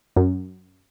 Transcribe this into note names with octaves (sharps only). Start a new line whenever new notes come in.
F#2